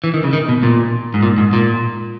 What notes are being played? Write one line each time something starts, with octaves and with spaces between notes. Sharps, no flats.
E3
D#3
C#3
D#3
B2
A#2
G#2
A#2
G#2
A#2